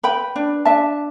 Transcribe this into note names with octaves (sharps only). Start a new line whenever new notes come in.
B4 G5 B5
D4
D4 E5 A5